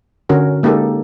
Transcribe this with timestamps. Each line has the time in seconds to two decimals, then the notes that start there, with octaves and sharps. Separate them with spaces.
0.29 D3 C#4 F#4 A#4
0.63 G#3 A#3 D#4 G4 A4